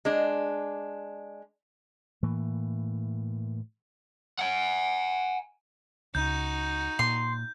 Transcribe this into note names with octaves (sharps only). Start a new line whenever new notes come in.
G#3 D4
A2 E3 A#3
F#5 G#5
C#2 D#4 F#4 G6
A#2 C6